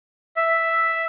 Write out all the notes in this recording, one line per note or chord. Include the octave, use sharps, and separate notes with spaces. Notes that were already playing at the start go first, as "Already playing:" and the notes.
E5